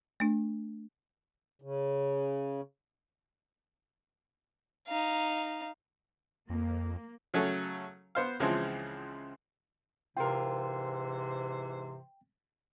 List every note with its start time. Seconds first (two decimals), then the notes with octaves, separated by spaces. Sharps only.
0.20 A3 D4
1.62 C#3
4.87 D#4 F5
6.50 F2 A#3
7.34 C#3 F#3 A3 C#4 A4
8.15 B3 C5 F5
8.40 C#2 C#3 E3 F3 G#3 C4
10.17 G#2 C3 E3 F4 A#4 C5 G5